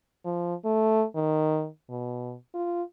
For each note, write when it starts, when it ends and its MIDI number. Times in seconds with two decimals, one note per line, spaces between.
0.25 0.54 53
0.65 1.05 57
1.15 1.68 51
1.90 2.35 47
2.54 2.83 65